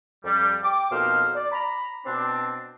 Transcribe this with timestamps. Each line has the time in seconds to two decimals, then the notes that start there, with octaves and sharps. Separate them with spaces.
0.24 F2 G3
0.63 G5 D6
0.91 F2 B2 A#3 D#4 C5 F6
1.35 D5
1.52 A#5 B5
2.05 B2 C4 D4